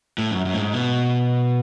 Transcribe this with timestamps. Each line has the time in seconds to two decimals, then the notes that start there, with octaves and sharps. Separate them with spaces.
0.18 A2
0.31 F#2
0.45 F#2
0.54 A2
0.59 G#2
0.73 B2